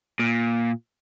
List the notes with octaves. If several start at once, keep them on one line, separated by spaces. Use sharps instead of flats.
A#2